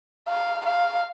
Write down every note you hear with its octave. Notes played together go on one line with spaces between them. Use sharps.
F5
F5